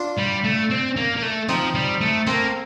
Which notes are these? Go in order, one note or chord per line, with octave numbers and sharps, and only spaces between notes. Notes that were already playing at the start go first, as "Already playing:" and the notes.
Already playing: D4 F4
G3
A3
C4
A#3
A#3
A3
F3 C4 D#4
G3
A3
A3 A#3 C4